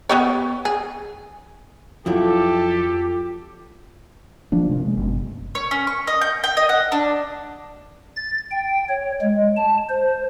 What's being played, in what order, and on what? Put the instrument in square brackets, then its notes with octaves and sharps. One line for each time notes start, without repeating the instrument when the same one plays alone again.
[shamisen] B3 G4 C#5
G#4
[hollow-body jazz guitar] F2 F#3 E4 [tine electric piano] F4 [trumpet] G4 [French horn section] A4
[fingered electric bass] F3 A#3 D4
C3 A#3
G#3
F#1 B2
[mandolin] C#5
C#4
C#6
D#5
G6
G5
D#5
F#5
D4
[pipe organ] A6
G5
C#5
G#3
A5
C5